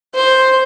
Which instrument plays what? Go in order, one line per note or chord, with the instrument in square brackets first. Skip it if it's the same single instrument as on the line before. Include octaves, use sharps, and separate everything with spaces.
[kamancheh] C5